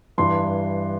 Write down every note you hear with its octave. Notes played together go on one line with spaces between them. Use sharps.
G2 E3 C6